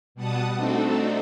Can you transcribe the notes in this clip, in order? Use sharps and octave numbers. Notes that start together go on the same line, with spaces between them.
B2 G3 F#5 A5 D#6
A3 C4 D4 D#4 F#4 A4